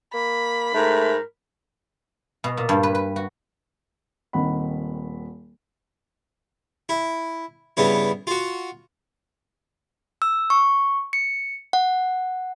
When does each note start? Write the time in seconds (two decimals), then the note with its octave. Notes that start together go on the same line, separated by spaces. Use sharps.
0.14 A#3 B5
0.74 G#2 A3 A#4
2.44 B2
2.57 A#2
2.69 G2
2.83 B4
2.95 B4
3.16 F#4
4.33 D#1 D#3 C4 F#5 B5
6.89 E4
7.77 G2 C#3 B3 E4
8.27 F4 F#4
10.22 E6
10.50 C#6
11.13 C#7
11.73 F#5